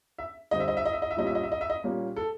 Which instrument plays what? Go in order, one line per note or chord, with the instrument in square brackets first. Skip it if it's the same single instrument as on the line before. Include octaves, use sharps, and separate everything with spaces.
[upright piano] E5
D3 G3 C4 D#5
E5
D#5
E5
D#5
E5
D#5
E5
A#2 G3 A#3 C#4 D#5
E5
D#5
E5
D#5
E5
D#5
A#2 G3 A#3 C#4
A4